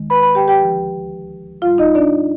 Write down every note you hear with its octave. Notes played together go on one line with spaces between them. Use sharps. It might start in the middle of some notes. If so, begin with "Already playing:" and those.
Already playing: D#2 D#3 G#3
B4 B5
B4 B5
G4 G5
G4 G5
D2 D3 F3
G#2 G3 F4 F5
D#4 D#5
D4 D5